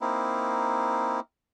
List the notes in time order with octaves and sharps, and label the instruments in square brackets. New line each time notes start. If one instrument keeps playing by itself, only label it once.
[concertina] A#3 C4 D#4 E4